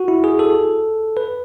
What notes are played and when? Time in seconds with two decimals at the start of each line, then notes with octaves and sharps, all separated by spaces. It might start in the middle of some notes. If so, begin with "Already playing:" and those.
Already playing: F#4
0.08 E4
0.24 G#4
0.39 A4
1.17 B4